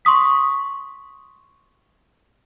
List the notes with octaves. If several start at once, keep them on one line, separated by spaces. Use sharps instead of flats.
C6 C#6 D#6 B6